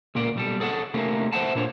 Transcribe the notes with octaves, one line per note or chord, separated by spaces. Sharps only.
C#2 A#2 A#3 D5
B1 G3 A4
G#4 A4 C#5 F#5
C3 D#3 A3 A#3 C#4
B4 C5 D5 E5 F#5 A5
A#2 D4 C#5